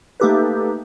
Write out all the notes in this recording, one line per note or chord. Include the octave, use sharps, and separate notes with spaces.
A3 A#3 D#4 G4 A4 B4